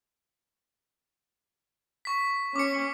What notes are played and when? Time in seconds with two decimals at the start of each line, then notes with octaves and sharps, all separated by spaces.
2.05 C#6 B6
2.56 C#4 D6 C#7